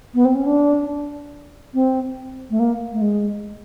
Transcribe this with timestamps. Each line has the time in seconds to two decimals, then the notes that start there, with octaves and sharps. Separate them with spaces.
0.14 B3
0.25 C4
0.35 C#4
0.46 D4
1.74 C4
2.50 A3
2.59 A#3
2.92 A3
3.02 G#3